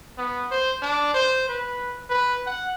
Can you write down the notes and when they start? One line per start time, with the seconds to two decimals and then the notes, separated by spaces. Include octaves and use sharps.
0.17 B3
0.51 C5
0.82 D4
1.14 C5
1.49 B4
2.09 B4
2.46 F#5